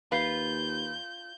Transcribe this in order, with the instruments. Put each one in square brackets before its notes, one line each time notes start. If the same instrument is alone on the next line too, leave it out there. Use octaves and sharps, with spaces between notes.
[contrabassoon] D#2 [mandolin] F4 [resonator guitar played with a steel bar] B4 [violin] G6